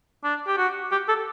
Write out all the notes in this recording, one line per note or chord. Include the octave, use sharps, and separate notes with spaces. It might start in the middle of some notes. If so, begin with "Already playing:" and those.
D4
G4
F#4
G4
A4